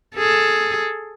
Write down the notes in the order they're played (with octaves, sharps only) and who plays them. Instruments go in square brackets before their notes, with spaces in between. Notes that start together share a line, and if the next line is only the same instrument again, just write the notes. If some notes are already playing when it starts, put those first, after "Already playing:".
[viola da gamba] G#4 A4